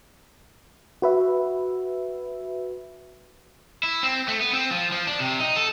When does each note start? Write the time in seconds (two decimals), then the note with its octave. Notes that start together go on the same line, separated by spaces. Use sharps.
1.02 F#4 B4 E5
3.83 E4
4.03 C4
4.28 A3
4.41 B3
4.53 C4
4.71 F3
4.92 F3
5.07 D4
5.20 C3
5.40 D#4
5.56 A4